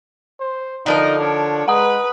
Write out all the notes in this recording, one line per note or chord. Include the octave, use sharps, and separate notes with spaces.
C5
D3 F3 D#4 A#4
D4 C#5
G#3 B4 F#5 A#5 D#6